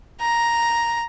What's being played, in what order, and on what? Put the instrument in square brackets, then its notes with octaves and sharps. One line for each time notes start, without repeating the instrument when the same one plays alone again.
[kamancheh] A#5